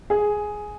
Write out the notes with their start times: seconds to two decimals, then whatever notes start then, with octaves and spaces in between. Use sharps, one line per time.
0.10 G#4